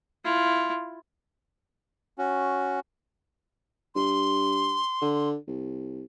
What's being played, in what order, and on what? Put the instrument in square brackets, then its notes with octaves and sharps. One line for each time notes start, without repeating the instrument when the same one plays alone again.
[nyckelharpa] E4 F4
[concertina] C#4 F#4
[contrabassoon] G2 [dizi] C6
[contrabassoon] D3
C2